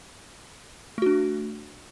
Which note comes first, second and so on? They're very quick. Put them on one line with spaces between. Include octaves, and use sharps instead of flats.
A3 F#4 D4